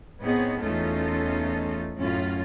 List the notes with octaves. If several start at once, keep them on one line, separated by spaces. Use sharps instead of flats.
A2 B3 C4 D#4 G#4 C#5
E2 A3 C#4 D#4 F4 A4
F#2 A2 C#4 F4